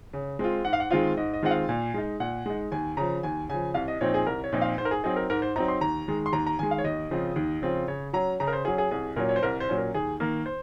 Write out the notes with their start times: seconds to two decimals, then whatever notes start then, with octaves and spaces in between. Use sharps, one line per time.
0.13 C#3
0.39 G#3 C4 F4
0.65 G#2 F#5
0.73 F5
0.80 F#5
0.90 D#3 G#3 C4 F4 F5
1.17 G#2 D#5
1.33 D#5
1.42 D#3 G#3 C4 F4 F#5
1.51 F5
1.69 A#2
1.94 G#3 D#4
2.20 A#2 F#5
2.46 G#3 D#4
2.72 D#2 G#5
2.97 C#3 F3 A#5
3.23 D#2 G#5
3.49 C#3 F3 G#5
3.74 C2 F5
3.88 D#5
4.01 A#2 F3 C4 D#4 C#5
4.14 G#4
4.27 C2 A#4
4.44 C#5
4.52 A#2 F3 C4 D#4
4.61 F5
4.78 G#2 C5
4.85 A#4
4.91 G#4
5.04 F#3 C4 D#4 G#4
5.16 A#4
5.30 G#2 A#4
5.42 C5
5.56 F#3 C4 D#4 A#5
5.68 C6
5.81 D#2 A#5
6.08 D#3 G#3
6.26 C6
6.32 D#2 A#5
6.47 A#5
6.59 D#3 G#3 G#5
6.71 F5
6.78 C#5
6.84 D#2 D#5
7.11 C#3 F3 C4 F4
7.36 D#2
7.62 C#3 F3 C4 F4
7.88 C#3 C#5
8.13 F#3 C#4 A#5
8.40 C#3 A#5
8.47 A#4
8.53 C5
8.65 F#3 C#4 G#4
8.78 G#4
8.91 C2 G#4
9.16 A#2 F#3 C#4 A#4
9.29 C#5
9.36 C5
9.43 C2 A#4
9.60 C5
9.69 A#2 F#3 C#4
9.78 A#4
9.94 D#2 G#4
10.20 D#3 A#3 A#4
10.46 C5